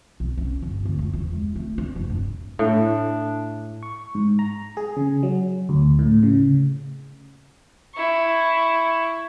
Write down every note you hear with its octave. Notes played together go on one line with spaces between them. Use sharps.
B1
C#4
G1
D2
F#1
E2
G#3
A3
D4
F1
G2
A2 D4
C#6
G#2
A#5
G#4
C#3
F#3
D2
A2
C#3
E4 C#6